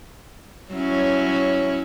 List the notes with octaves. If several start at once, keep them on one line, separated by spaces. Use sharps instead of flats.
F#3 C#4 E4